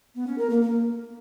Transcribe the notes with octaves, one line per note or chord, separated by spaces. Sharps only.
B3
C#4
A#4
A#3
A#3